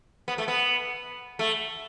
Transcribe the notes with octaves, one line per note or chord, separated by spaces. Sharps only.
B3
A3
B3
A3